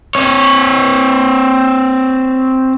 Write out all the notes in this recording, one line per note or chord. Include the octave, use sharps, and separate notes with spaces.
C4 C#5